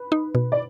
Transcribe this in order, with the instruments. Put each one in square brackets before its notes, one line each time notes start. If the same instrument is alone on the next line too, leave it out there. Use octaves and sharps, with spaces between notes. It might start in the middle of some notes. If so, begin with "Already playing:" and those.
Already playing: [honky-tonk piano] B4
[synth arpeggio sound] D#4
B2
[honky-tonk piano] D5